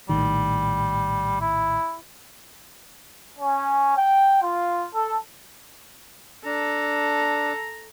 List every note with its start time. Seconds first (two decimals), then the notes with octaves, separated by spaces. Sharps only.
0.09 A#1 A2 D#3 G3
1.41 E4
3.38 C#4
3.96 G5
4.42 F4
4.94 A4
6.45 D4 A4 A#5